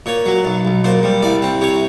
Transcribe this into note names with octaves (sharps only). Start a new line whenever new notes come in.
A#2 C#5
F#3
B1
B1
A#2 C5
G3
C2 D5
C4
C3 C#5